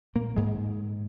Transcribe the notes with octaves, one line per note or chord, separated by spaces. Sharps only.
A#2 A#3
G#2 G#3